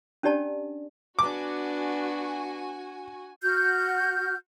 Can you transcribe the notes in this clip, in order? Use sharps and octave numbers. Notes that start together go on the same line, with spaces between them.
C#4 D4 G4 D5 A5
B3 D4 F#4 G#5 D6
F#4 F6 G6